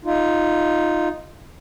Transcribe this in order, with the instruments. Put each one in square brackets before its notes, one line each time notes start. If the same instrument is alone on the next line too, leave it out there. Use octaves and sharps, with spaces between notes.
[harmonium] D#4 F4